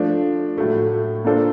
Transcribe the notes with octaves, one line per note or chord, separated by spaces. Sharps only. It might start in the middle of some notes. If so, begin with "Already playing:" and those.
Already playing: F3 A3 D4
A2 F#3 A3
A#3 D4 F4 A4 C5